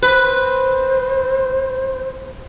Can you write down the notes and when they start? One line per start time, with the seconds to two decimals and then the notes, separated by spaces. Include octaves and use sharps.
0.03 B4 C5